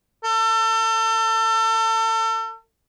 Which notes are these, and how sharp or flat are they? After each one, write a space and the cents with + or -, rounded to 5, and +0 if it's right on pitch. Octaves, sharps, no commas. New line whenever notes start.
A4 +35